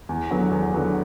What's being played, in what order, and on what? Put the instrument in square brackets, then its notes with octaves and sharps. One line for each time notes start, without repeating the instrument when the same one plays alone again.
[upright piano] E2
D3 F#3 B3
E2
D3 F#3 B3